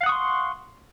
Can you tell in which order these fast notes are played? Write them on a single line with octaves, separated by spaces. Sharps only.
F5 F#5 D#6 C#6 C6